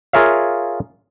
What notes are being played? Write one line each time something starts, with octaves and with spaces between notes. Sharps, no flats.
F4 G#4 A#4 C#5 E5 F5